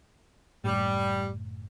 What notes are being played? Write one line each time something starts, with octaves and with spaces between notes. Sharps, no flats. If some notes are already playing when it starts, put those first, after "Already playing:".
F#1 A2 G3